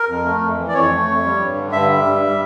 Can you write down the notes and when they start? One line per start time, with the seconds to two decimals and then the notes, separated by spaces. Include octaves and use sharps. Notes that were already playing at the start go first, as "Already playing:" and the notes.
Already playing: A#4
0.08 F2
0.25 A3
0.41 F2
0.58 E3
0.68 D5
0.74 F2 C#5
0.90 A3
1.07 F2
1.23 G3
1.40 G2
1.56 D3
1.72 G2 E5
1.88 G3
2.05 G2
2.21 G3